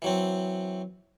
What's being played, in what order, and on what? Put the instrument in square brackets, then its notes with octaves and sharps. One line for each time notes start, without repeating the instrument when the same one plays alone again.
[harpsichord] E3 F#3 C4